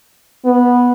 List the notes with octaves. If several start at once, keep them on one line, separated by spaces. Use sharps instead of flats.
B3